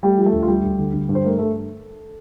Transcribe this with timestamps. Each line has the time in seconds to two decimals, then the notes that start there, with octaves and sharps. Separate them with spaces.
0.03 G3 A3 G4
0.18 F3 G4
0.26 A3 A4
0.33 D2
0.42 F4
0.48 G3 A3 G4
0.64 D2
0.79 D3
0.94 D3
1.09 G2
1.15 C5
1.24 A3 A#4
1.39 G2 A3 A4